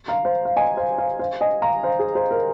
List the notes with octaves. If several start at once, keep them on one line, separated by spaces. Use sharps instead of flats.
F5 A#5
C5 F5
F5
D#5 G#5
C5 F5
C5 F5
C5 F5
D#5 G#5
F5 A#5
C5 F5
G#4
G#4 C5
A#4